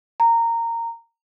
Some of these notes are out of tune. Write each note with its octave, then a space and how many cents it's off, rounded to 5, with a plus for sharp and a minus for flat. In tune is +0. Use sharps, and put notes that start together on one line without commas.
A#5 -15